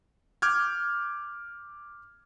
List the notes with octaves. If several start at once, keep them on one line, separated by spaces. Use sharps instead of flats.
D6 F6 G6 G#6